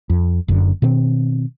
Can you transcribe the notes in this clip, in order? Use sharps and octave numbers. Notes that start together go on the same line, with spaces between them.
F2
F#1 F#2 D3
B2 D#3 C4